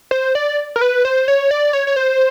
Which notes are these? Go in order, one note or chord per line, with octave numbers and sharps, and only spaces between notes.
C5
D5
A#4
B4
C5
C#5
D5
C#5
C#5
C5